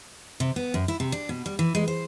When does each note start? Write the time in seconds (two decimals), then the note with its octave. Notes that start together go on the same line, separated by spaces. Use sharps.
0.40 C3
0.56 B3
0.74 F#2
0.88 E4
1.00 C3
1.12 D4
1.29 B2
1.46 G3
1.59 E3
1.75 G#3
1.88 C5